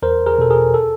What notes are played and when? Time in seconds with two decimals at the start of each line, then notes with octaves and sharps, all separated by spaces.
0.02 E2 A#4 C5
0.26 G#4 A#4
0.38 B2 A4
0.51 G#4 A#4
0.74 A4